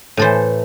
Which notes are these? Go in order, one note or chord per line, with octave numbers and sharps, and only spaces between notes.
A2 E3 A4 C5